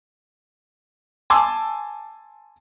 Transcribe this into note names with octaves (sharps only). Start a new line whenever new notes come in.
G#5 A5 C6 D6 E6